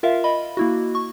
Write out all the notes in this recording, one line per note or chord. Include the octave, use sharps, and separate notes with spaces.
F4 A#4 E5 F5
D#5 B5
A#3 E4 F#4
C#6